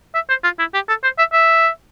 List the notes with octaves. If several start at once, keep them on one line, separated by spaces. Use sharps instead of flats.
E5
C5
F4
E4
G4
A4
C5
E5
E5